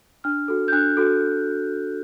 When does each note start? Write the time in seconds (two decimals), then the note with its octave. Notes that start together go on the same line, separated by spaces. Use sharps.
0.24 D4 F6
0.48 F#4 A4
0.68 G6
0.72 D4 F#6
0.97 F#4 A4